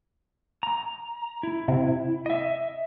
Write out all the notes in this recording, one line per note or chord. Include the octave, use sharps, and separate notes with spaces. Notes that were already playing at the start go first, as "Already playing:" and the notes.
A#5
E4
C3
D#5 E5